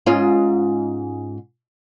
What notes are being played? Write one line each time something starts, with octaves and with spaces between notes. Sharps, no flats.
G#2 C#4 F4